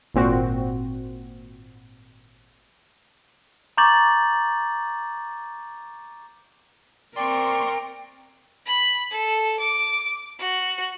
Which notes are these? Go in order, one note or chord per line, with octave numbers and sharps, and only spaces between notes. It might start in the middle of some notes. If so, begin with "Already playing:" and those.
G#1 A#2 C4 F#4
A#5 C#6 D6 G6 A6 F#7
C4 A#4 D5 G5 C6 C#6
B5
A4
D6
F#4